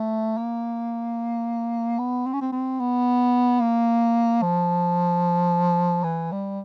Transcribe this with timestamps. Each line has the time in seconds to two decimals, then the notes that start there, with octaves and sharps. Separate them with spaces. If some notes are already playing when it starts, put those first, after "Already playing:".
Already playing: A3
0.37 A#3
1.99 B3
2.26 C4
2.33 C#4
2.41 C4
2.52 C4
2.79 B3
3.61 A#3
4.42 F3
6.04 E3
6.31 G3